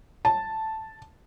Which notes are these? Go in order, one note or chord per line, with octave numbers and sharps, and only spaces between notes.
A5